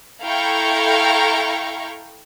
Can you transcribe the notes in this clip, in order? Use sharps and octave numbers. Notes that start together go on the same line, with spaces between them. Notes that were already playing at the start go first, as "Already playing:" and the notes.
E4 A4 F5 G5 A#5 C#6